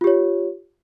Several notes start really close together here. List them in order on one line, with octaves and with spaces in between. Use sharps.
F4 G4 C#5